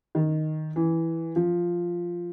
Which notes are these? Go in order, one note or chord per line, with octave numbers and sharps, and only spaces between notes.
D#3
E3
F3